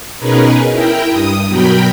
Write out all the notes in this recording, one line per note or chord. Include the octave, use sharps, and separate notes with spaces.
B2 C#4 D#4 G#4 A#4 B4
E4 A#4 G5
G2 D#6
B2 F#3 A#4 G5 B5